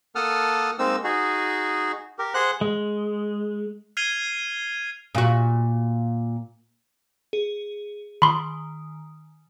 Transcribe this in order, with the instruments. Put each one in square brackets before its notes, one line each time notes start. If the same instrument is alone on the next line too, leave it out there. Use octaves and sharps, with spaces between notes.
[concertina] A#3 A4 F#5 A5 D#6 F6
G#3 A#3 C4 D#4 E6
D#4 F#4 G#4
G4 A#4
G#4 C5 F#5 F#6
[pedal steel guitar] G#3
[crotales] F6 G#6 C7 D#7 F7 G7
[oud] A#2 F#4
[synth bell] G#4
[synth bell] D#3 [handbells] B5 C6